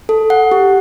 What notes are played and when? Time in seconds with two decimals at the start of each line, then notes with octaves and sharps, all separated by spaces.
0.09 A4
0.30 F#5
0.52 G4